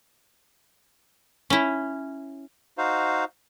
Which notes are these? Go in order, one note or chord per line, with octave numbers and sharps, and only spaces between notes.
C#4 E4
D#4 F#4 C5 F5